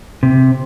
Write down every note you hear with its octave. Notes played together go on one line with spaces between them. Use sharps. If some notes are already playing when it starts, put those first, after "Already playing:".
C3